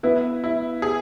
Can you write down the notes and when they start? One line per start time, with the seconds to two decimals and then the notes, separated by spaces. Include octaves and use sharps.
0.03 B3 E4 B4
0.44 E4
0.82 G#4